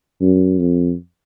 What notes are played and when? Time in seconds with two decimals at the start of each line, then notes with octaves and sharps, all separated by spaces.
0.21 F#2
0.59 F2